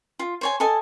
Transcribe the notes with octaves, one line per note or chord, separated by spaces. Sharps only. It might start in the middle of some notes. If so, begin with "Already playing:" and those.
F4
C5 C#5 G#5
A4 D#5 G#5 A5